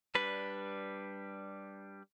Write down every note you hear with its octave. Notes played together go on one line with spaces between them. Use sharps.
G3 D4 B4